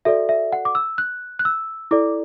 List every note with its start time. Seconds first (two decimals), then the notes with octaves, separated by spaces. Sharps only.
0.05 F#4 A4 D5 E5
0.29 E5
0.52 F#5
0.65 D6
0.75 E6
0.98 F#6
1.39 F#6
1.45 E6
1.91 E4 A4 D5 D6